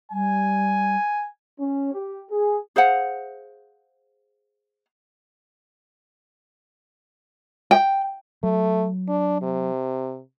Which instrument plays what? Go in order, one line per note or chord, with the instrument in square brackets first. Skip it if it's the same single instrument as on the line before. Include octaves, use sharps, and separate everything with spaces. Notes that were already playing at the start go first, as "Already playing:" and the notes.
[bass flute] G3 [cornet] G#5
[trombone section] C#4
G4
G#4
[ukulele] G#4 C5 F5 F#5
G5
[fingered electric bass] F#3 [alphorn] A3
[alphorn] D4
C3